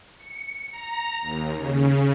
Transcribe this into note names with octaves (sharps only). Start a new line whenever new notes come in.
C#7
A#5
D#2
C#3